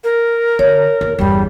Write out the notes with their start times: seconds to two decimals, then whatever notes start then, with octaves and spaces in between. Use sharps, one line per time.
0.04 A#4
0.59 D3 C#5
1.01 D#2
1.19 G1 E2 G3